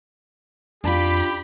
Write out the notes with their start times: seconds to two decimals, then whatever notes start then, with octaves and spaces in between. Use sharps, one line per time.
0.84 F2 D4 F4 G4 B5